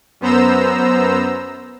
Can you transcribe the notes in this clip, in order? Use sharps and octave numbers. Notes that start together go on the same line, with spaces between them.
F#2 B3 C5 A#5 E6